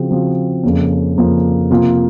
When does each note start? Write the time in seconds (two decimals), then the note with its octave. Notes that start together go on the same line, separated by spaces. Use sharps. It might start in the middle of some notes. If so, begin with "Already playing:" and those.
Already playing: C#3 F3 C4 F#4
0.10 C#3 F3 C4 F#4
0.63 F2 C#3 F3 A#3 C#4
1.17 F2 C#3 F3 A#3 C#4
1.70 C3 F3 A#3 F4